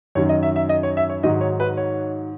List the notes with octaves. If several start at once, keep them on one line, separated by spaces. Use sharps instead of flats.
F#2 D#3 F#3 C#5
D#5
E5
E5
D#5
C#5
E5
C#5
G#2 D#3 F#3 D#5
C#5
B4
C#5